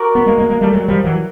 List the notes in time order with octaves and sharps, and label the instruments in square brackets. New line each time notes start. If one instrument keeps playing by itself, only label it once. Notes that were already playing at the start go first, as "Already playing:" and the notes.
Already playing: [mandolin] F#4 A#4 D5
[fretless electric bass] B3
G#3 A#3
G#3 A#3
G#3 A#3
G3 A3
F#3 G#3
F3 G3
E3 F#3